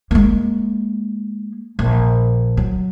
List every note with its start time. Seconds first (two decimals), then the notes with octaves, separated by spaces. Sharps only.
0.11 G#3 A#3
1.79 A#1
2.57 F#3